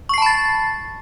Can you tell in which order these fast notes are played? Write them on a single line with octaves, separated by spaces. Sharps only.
C#6 C7 A5 B5 A6